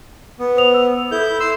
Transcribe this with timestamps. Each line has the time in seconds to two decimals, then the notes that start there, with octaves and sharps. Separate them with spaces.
0.39 B3
0.56 C5 D#6 F7
0.74 E6
1.12 E4 A4 G6
1.40 C6 E6